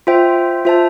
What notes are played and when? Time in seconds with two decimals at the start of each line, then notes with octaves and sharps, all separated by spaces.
0.07 F4 C5 E5 G5
0.65 F4 C5 E5 A5